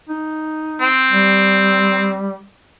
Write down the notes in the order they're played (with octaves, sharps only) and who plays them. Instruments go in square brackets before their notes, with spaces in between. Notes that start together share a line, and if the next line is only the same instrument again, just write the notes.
[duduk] D#4
[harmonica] C4
[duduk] G3